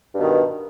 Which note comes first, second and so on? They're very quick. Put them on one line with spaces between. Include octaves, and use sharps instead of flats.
G2 B2 D#3